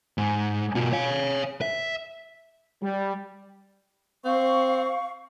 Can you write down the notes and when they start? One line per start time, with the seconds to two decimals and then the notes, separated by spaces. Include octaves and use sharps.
0.18 G#2
0.75 B2 F4
0.93 C#5 F5
1.61 E5
2.83 G3
4.25 C4 F5 C#6